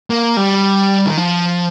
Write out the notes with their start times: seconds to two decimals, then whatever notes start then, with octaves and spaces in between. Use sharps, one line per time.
0.10 A#3
0.37 G3
1.06 D#3
1.17 F3